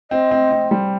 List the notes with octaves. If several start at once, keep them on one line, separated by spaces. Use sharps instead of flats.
C4 D#5
C4
C4
G3